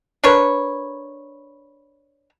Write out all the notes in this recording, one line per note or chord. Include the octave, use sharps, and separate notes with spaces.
D4 A#4 B4 C#5